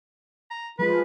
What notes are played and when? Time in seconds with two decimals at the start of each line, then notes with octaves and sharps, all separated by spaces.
0.51 A#5
0.79 F3 G#3 F4 B4